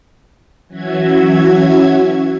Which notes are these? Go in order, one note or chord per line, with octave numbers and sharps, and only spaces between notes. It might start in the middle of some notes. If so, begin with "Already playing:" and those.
E3 F#3 C#4 F#4 E5 G#6